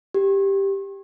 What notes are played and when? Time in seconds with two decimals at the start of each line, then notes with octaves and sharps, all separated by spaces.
0.14 G4